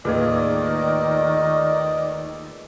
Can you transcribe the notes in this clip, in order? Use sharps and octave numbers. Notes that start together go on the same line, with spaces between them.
D#2 A2 D#3 F4 G#4 B4 D5 D#5